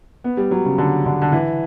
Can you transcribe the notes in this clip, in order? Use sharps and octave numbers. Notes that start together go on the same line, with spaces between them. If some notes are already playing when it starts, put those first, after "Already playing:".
B3
G3
F#3
C#3
D3
D3
D3
E3